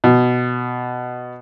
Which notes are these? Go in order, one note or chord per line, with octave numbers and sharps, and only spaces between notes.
B2